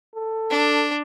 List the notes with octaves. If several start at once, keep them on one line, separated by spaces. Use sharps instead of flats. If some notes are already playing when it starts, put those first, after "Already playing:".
A4
D4